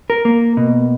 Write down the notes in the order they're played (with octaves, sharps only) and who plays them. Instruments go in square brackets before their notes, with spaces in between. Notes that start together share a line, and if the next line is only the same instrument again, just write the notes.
[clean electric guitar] A#4
A#3
B2